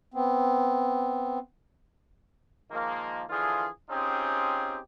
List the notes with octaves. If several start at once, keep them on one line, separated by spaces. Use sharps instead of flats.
B3 C4
D#3 F3 G#3 A#3
D3 E3 F3 F4 G#4
C4 C#4 D#4 F4 G4 G#4